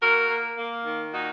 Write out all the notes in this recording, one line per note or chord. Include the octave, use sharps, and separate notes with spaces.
A#3 F#4 A#4
A#3
A#3
D#3
A#2 D#4 F#4